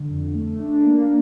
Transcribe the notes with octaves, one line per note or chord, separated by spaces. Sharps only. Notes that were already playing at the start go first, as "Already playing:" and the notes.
Already playing: D3
F2
A3
D4
A#3